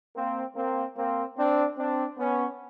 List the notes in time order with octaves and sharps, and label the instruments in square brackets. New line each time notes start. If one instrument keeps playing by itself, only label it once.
[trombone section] A#3 C4
A#3 C4
A#3 C4
C4 D4
C4 D4
B3 C#4